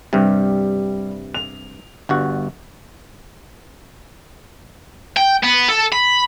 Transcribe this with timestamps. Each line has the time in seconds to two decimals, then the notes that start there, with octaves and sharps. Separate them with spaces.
0.13 G2 C3 G3
1.35 F7
2.09 G1 G2 F#4
5.17 G5
5.43 B3
5.69 A4
5.92 B5